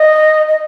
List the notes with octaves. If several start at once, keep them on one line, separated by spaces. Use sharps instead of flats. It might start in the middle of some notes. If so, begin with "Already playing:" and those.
Already playing: D#5
D#5